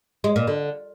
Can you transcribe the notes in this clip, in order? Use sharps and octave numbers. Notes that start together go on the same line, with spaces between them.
G#3
A#2
D3